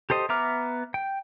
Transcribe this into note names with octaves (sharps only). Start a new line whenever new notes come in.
G4 A4 C5 D#5
B3 E5 A#5 D6 F6
G5